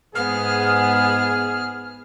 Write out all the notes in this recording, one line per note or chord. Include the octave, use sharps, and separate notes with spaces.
G#2 B3 G#4 F6